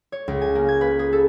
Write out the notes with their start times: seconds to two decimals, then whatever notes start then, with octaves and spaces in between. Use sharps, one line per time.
0.12 C#5
0.28 C#2
0.41 G#5
0.55 A#3
0.68 G#6
0.81 B4
0.99 G#4
1.13 A4